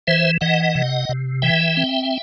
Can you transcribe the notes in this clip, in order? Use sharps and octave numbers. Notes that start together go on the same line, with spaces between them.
E3 C5 E5
E3 D#5 F#5
C3
C3
E3 E5 G5
C4